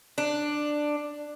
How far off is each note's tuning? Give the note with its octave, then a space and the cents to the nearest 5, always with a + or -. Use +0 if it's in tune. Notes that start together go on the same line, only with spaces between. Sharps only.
D4 +10